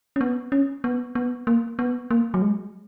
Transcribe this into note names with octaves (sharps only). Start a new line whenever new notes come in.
C#4
B3
C#4
B3
B3
A#3
B3
A#3
F#3
G#3